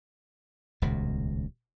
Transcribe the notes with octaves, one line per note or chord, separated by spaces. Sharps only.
D#1 C#2 B2